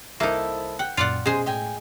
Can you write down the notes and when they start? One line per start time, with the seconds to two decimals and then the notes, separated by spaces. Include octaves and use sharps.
0.20 C2 A#3 D#4 E4 A4 C5 A5
0.79 F#5 G5
0.97 F#2 A#2 F4 D5 F#5
1.26 B2 G#3 C#4 G#4 C5
1.46 A2 A3 D#5 G5 G#5